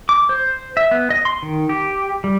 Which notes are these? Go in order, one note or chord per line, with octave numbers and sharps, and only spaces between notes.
D6
C5
E5
B3
D#5
C6
D#3
G4
G3